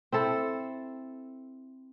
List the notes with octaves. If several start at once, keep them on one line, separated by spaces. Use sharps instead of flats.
C4 E4 A4